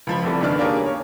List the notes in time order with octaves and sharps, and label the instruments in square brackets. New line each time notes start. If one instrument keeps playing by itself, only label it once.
[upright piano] C#2 F3 B5
F1 C2 A3 D5
G1 C#2 D#3 D4 D5 F6
A#3 D4 G4 G#4 A#4 C#5
C#5